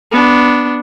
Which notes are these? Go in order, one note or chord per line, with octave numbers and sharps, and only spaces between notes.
B3 D4